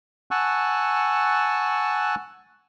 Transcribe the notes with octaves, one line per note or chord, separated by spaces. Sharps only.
F#5 G#5 A5 C#6 E6 F#6